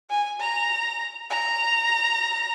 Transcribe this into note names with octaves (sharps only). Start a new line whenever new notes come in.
G#5
A#5
A#5